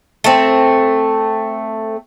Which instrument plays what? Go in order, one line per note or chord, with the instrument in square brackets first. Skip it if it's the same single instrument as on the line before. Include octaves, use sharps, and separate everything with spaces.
[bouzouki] A3 C4